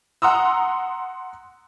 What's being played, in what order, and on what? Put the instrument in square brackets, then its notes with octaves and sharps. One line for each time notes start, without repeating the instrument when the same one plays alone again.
[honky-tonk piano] F#5 A#5 C6 D#6 E6